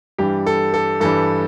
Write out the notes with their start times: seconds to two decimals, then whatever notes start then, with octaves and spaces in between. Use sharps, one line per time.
0.18 G2 E3 G3 G4
0.46 A4
0.74 A4
1.00 G2 E3 G3 A4